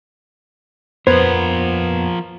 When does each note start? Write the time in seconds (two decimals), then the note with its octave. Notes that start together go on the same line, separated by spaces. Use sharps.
1.07 F2 F3 B3 A#4 C5 G#6